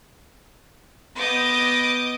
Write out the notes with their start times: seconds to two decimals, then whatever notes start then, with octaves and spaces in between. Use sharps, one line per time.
1.17 B3 D#5 D6 D#6 G6